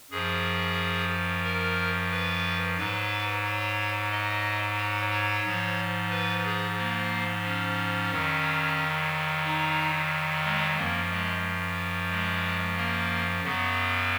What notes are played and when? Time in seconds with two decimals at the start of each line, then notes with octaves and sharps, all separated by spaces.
0.11 F#2 F3 G#4
1.44 A#4
2.11 B4
2.78 G#2 F#3 B4
3.44 C#5
4.11 D#5
4.78 C#5
5.11 C#5
5.44 G#2 F3
6.10 B4
6.44 G#4
6.78 A#3
7.44 C#4
8.11 F2 D#3 F#3
9.44 D#4
10.44 G#3
10.77 F#2 F3 A#3
11.11 G#3
12.10 G#3
12.77 A#3
13.44 F#2 C#3 F#3 B3